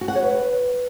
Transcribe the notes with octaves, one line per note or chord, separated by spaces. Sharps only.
F#4
F#5
C#5
B4